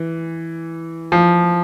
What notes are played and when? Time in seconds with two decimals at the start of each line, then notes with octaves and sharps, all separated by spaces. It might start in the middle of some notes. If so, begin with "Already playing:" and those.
Already playing: E3
1.12 F3